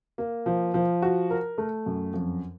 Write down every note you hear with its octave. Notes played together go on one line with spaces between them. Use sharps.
A#3
F3
F3
F#4
A#4
A3
F#2
F2